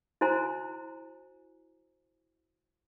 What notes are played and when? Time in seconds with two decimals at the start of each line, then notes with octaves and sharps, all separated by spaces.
0.21 E4 F#4 C5 G#5 A#5